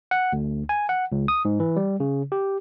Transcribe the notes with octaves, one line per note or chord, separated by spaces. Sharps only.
F#5
D2
G#5
F#5
C#2
D#6
G#2
E3
G3
C#3
G4